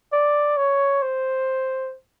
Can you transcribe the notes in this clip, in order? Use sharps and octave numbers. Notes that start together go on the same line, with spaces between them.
D5
C#5
C5